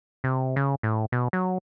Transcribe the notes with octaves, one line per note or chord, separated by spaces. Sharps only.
C3
C#3
A2
B2
F#3